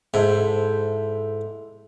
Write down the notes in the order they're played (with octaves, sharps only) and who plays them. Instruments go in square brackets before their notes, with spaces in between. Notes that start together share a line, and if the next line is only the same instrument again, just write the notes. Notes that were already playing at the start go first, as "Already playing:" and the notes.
[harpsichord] G#2 [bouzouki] E4 A4 C5